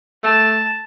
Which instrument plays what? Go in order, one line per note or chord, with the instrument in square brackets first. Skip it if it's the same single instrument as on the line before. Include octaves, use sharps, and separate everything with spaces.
[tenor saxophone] A3 [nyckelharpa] A5